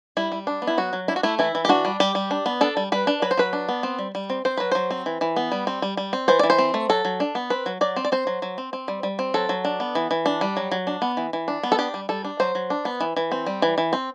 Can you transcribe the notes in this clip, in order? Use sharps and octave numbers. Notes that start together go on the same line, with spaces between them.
G3 E4
G3
D4
B3
E4
F#3 F#4
F#3
D4 E4
F#4
A3 E4
E3 E4
E3
G4
D4 F#4
G3
G3 G4
G3
D4
B3
D4 A4
G3
G3 B4
D4
F#3 B4
C5
F#3 B4
D4
B3
C4
G3
G3
C4
C4 C5
F#3 B4
F#3 C5
C4
E3
E3
B3
G3
C4
G3
G3
C4
E3 C5
E3 D5
C5
C4
A3
F#3 A4
F#3
D4
B3
C4 B4
F#3
F#3 D5
C4
D5
C4 C5
F#3
F#3
C4
C4
G3
G3
C4
F#3 A4
F#3
D4
B3
E3
E3
D4
G3
F#3
F#3
D4
B3
E3
E3
D4
B3
A4
D4 G4
G3
G3 A4
D4
F#3 C5
F#3
D4
B3
E3
E3
C4
G3
E3
E3
C4